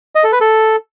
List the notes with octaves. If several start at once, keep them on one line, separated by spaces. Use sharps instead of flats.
D#5
A4
B4
A4